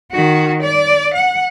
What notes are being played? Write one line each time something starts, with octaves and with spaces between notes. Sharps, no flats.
D#3 F#4
D5
F#5